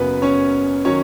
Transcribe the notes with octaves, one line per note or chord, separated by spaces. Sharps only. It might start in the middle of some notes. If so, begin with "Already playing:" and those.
Already playing: F#1 F#2 C#3 F#3 B3 B4
C#4 C#5
D#3 F#3 C#4 C#5